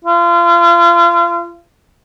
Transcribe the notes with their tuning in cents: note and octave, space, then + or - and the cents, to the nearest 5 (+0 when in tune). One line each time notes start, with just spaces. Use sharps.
F4 -35